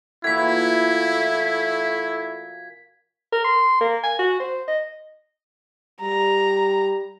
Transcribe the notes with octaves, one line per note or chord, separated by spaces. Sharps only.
A#2 E3 A3 E4 F#4 G#6 B6
A#4
C6
A#3
G#5
F#4
C5
D#5
G3 A#5